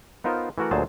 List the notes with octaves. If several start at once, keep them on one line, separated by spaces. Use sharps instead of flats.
B3 D#4 F4 A#4 C5
E3 A3 F#4 A#4 F#5
D2 A#2 F#3 G#4 C5 A5